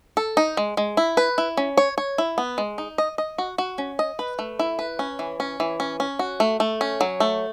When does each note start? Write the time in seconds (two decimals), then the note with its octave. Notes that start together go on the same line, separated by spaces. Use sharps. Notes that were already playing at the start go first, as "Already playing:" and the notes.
0.17 A4
0.37 D#4
0.57 G#3
0.77 G#3
0.97 E4
1.17 B4
1.38 E4
1.57 C#4
1.77 C#5
1.98 C#5
2.18 E4
2.38 B3
2.58 G#3
2.78 D#4
2.98 D#5
3.18 D#5
3.38 F#4
3.58 F#4
3.78 C#4
3.99 D#5
4.19 B4
4.39 A3
4.59 E4
4.79 B4
4.99 C#4
5.19 E3
5.40 C#4
5.60 E3
5.80 C#4
6.00 C#4
6.19 F#4
6.40 A3
6.60 A3
6.81 C#4
7.01 F#3
7.20 A3